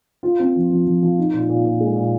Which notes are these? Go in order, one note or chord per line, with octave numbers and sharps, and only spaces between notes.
F4
C4
F3
F3
F3
F3
D#4
A#2
A#2
A#2
G#3
A#2